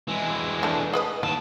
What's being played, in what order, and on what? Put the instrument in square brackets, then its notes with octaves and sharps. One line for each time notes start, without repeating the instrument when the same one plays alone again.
[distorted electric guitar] E3 G#3
[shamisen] A3 D4
G#4 B4 D#5
[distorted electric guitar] D#2 A5 [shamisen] E4